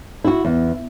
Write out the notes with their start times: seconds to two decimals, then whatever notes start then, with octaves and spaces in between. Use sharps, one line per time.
0.24 E4 F#4
0.45 E2